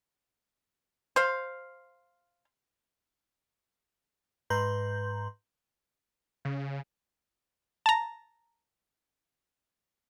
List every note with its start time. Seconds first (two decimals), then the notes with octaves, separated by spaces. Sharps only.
1.16 C5 F5
4.50 G#2 B4 A#5 C6 G6
6.45 C#3
7.86 A5 A#5